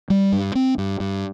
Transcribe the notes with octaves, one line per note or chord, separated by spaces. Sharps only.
G3
G2
C4
G2
G2